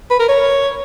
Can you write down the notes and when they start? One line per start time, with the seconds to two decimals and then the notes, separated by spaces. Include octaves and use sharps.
0.10 B4
0.19 A#4
0.28 C#5